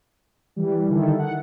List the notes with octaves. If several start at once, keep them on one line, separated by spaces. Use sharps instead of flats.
E3 G3
D3 D#3 E4 A4
F#5